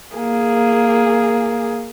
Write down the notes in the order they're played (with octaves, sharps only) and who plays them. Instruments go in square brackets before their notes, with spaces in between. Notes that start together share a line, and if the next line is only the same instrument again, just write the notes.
[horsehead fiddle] A#3 G#4